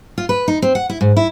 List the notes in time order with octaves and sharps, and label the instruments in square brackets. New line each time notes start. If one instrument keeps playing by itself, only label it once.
[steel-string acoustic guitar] F4
B4
D#4
C4
F#5
E4
G#2
E4